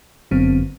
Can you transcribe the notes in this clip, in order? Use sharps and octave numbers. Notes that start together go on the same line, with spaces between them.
G1 F#2 D3 F#3 B3 C4